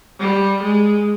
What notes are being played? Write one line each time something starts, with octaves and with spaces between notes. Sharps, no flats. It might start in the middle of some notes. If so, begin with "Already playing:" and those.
G3
G#3